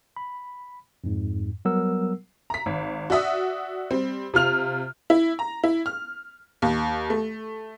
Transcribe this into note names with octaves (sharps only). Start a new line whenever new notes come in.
B5
F2 G#2
F#3 G3 B3 A#4 F#5 E6
A#5 B6
G#1
F#4 D5 E5 D#6
G3 C4
C3 F4 F6 F7
E4
A#5
E4
F6
D#2
A3